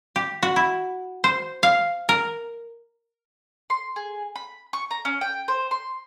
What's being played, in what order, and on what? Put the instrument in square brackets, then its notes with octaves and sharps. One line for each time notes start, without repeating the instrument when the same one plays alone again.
[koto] G4
F#4
E4
C5
F5
A#4
[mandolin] C6
G#4
B5
C#6
A#5
C#4
G5
C5
C6